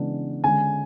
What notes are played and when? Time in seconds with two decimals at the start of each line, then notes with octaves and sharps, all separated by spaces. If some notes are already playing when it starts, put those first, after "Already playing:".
Already playing: C#3 E3 G#3 B3 D4
0.44 D3 G#3 C#4 G#5